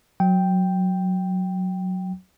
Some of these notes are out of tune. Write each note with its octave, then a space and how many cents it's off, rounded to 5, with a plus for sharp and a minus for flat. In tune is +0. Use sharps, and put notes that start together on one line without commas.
F#3 -5 G5 +0